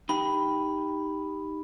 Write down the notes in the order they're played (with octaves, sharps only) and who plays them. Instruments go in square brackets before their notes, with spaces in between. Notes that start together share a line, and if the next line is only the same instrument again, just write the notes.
[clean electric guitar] D#4 G4 G5 [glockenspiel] B5